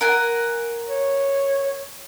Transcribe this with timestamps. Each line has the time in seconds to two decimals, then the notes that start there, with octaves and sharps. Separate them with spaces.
0.01 A#4 F#5 G#5
0.88 C#5